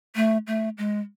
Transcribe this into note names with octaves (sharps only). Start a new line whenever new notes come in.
A3
A3
G#3